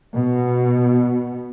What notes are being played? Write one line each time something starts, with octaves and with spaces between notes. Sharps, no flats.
B2